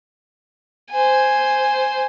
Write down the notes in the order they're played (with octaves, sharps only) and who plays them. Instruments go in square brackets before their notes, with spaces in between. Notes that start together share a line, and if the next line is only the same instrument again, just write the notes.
[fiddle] C5 G#5